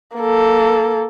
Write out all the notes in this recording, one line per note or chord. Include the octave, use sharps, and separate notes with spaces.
A#3 A4